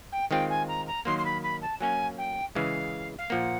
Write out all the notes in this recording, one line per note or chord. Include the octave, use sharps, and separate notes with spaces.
G5
D#3 G#3 C4 F4 G5
G#5
A#5
A#5
D#3 F#3 A#3 C6
C6
B5
B5
A5
F#3 A#3 C#4 G#5
G5
C#3 E3 G#3 F5
F5
A#2 F3 A#3 F#5